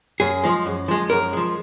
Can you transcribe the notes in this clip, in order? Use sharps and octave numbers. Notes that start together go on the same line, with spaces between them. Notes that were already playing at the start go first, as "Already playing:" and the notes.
F#2 G#4
F3 G#3
F#2
F3 G#3
F#2 A#4
F3 G#3